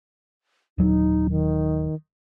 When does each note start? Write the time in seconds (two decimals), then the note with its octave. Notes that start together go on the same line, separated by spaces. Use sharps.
0.78 D#1 F#3 D#4
1.30 D#3